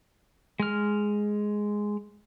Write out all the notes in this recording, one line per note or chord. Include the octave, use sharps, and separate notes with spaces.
G#3 F6